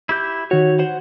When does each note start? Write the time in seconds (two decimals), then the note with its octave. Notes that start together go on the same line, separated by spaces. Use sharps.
0.09 E4 G4 G6
0.51 D#3 F#4 C#5
0.79 C5 F#5